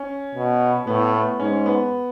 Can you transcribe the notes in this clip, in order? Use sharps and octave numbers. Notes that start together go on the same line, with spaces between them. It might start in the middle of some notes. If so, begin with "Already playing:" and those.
Already playing: C#4
B2
A2 B3
B3
G#2 C#4
B3